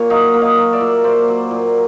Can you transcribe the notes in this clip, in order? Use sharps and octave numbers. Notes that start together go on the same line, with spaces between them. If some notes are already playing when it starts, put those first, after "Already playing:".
Already playing: A#2 A#3 C#5
F#3 D#5 F5
A#3
D#5 F5
F#3
D5 E5
A#2
A#3 C5 D5
F#3
A#2